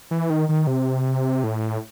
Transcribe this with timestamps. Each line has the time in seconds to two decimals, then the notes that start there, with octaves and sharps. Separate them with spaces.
0.11 E3
0.30 D#3
0.49 D#3
0.67 C3
1.44 A2